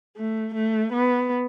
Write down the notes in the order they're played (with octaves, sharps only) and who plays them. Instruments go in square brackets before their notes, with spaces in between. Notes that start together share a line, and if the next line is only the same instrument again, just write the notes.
[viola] A3
A3
B3